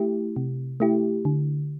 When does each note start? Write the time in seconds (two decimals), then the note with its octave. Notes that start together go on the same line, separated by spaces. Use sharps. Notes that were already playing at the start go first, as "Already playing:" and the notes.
Already playing: A3 E4 G4
0.36 C3
0.80 A3 E4 G4
1.25 D3